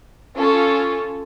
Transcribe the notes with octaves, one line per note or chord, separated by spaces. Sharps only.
C#4 F4 A4